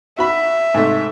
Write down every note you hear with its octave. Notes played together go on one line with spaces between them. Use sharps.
F#4 E5 B5
G#2 C3 A3